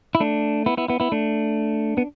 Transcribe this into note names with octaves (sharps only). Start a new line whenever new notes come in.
E4
A3 D4
B3 E4
B3 E4
B3 E4
B3 E4
A3 D4
B3